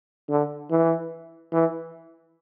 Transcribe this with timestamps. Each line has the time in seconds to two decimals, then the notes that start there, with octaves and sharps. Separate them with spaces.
0.29 D3
0.70 E3
1.52 E3